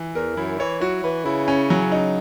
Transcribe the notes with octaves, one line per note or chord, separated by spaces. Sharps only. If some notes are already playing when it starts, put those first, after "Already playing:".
Already playing: E3
E2 A#4
F#2 E4
E3 C#5
F#3 F#4
E3 B4
C#3 E4
C#4
F#3
D#4